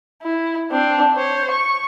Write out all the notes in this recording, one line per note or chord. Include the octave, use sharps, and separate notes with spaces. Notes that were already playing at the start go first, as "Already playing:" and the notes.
E4
C4 D4
C5 C#5
C#6